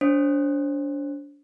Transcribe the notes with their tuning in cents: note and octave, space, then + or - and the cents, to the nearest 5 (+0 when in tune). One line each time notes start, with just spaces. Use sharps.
D4 -30 C5 +25